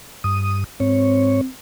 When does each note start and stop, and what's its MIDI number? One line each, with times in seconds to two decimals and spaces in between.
0.24 0.64 43
0.24 0.64 87
0.80 1.41 44
0.80 1.46 60
0.80 1.41 73